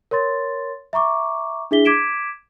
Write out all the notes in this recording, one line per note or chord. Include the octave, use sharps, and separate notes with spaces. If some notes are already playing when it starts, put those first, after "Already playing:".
A#4 C#5 C6 A6
E5 A#5 C#6 D6
D4 E4 G#4 E5 B6 G7
D6 G#6 B6 D7 E7